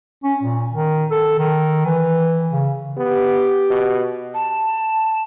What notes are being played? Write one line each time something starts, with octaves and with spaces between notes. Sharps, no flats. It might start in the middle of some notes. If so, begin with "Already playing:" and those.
C#4
A#2
D#3
A4
D#3
E3
C#3
B3 G4
B2
A5